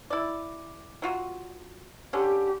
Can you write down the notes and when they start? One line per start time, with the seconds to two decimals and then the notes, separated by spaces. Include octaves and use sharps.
0.10 E4 D5
1.02 F#3 F4 F#4
2.13 D3 C#4 G4